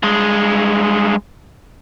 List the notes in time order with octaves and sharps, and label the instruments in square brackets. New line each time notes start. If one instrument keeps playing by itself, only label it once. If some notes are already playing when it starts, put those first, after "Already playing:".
[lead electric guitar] G2 G#3